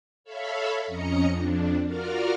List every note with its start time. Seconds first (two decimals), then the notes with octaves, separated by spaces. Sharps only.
0.24 A4 C#5 E5 F5 B5
0.87 F2 C#4 D#5 A#5 C#7
1.28 F2 D4
1.86 F4 F#4 A#4 D5 F6